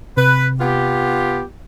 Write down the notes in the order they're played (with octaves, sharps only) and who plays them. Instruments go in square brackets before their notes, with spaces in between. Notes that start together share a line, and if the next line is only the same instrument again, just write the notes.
[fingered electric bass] C3 [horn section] B4
[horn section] B3 F4 G4